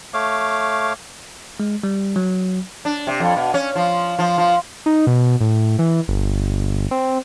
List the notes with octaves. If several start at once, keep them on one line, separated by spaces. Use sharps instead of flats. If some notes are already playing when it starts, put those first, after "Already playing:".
A3 C#5 F5 D6
G#3
G3
F#3
D4
C3
F2
B2
C#4
F3
F3
F3
D#4
B2
A2
E3
G1
C4